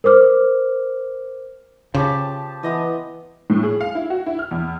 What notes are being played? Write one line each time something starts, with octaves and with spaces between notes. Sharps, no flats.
A#4 C5 D6 F6
C#3 F3 G4 A5
E3 B3 D#5 D#6
A2
G#4
F5
E4
F#4
E4
F6
E2